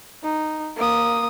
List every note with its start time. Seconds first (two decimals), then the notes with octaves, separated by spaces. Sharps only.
0.23 D#4
0.77 A#3 D#6